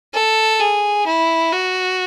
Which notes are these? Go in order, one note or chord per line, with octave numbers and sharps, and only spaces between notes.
A4
G#4
E4
F#4